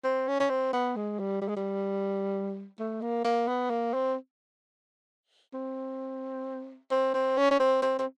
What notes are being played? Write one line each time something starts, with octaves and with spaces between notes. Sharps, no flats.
C4
C#4
C#4
C4
B3
G#3
G3
G3
G#3
G3
A3
A#3
A#3
B3
A#3
C4
C4
C4
C4
C#4
C#4
C4
C4
C4